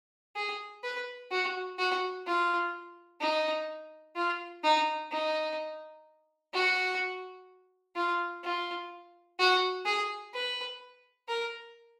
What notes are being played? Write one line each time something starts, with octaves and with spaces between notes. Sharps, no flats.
G#4
B4
F#4
F#4
F4
D#4
F4
D#4
D#4
F#4
F4
F4
F#4
G#4
B4
A#4